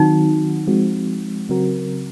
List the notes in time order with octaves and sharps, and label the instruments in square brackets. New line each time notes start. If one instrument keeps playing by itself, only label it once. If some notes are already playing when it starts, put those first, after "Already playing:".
Already playing: [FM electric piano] D#3 F#3 C4 F#4 [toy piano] D#4
[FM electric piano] F3 G#3 C4 F#4
C#3 F#3 C4 F#4 A#4